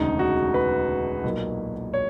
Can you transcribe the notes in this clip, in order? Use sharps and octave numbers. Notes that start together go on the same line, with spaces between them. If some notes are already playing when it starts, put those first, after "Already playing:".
Already playing: E1 D2 C#3 D#4
F#4
B4
B1 A#2 F#3 A#3
C#5